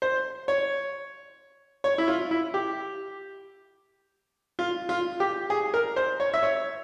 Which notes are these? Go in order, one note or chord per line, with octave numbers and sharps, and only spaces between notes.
C5
C#5
C#5
E4
F4
E4
G4
F4
F4
G4
G#4
A#4
C5
C#5
E5
C#5